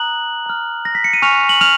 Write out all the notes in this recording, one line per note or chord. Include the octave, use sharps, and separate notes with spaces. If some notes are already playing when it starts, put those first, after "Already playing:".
Already playing: A#5 D#6 F#6 F#7
A#5 F6
A#6
B6
C#7
D#7
G#5 C#6 F6 F#6 F7
F#7
F6 F7